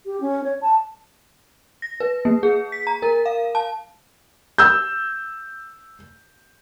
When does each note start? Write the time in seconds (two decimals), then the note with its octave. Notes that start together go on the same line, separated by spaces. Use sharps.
0.06 G4
0.21 C#4
0.44 C#5
0.61 A5
1.82 A#6
2.00 B4
2.25 A#3
2.43 G#4
2.72 B6
2.87 A#5
3.02 A#4
3.26 F5
3.55 A5
4.58 E6 G6